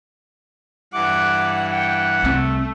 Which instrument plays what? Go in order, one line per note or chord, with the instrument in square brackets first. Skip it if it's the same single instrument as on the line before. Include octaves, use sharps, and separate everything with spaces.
[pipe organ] G2 E3 [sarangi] F#5 [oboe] D6
[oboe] F#5 [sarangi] G5
[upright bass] C2 C4 [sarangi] A3